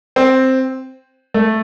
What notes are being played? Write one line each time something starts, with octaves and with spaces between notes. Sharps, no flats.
C4
A3